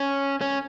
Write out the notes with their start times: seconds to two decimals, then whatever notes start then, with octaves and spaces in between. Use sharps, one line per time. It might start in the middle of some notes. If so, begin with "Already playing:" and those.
Already playing: C#4
0.41 C#4